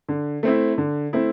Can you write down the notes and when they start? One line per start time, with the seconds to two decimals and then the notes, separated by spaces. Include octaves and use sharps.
0.09 D3
0.43 A3 C4 E4
0.78 D3
1.13 A3 C4 E4